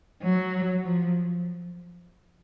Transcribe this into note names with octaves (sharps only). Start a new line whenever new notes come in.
F#3
F3